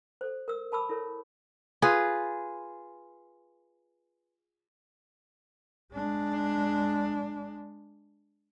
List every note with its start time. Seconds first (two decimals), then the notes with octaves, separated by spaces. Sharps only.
0.21 A4 C5
0.48 A#4 E6
0.72 A#4 A5 B5 D6 E6
0.89 E4 A4 A#4 C#5
1.82 F4 G#4 B4
5.93 G#3 D4